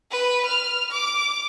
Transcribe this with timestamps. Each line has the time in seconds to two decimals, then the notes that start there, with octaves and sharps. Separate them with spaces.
0.11 B4
0.46 F6
0.91 D6